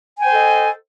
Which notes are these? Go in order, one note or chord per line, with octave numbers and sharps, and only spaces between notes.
A4 C5 D#5 G5 G#5